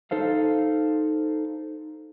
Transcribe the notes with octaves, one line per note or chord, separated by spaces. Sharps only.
D#4 A4 C5 F5